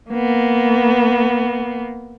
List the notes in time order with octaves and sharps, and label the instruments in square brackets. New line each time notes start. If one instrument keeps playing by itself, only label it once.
[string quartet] A#3 B3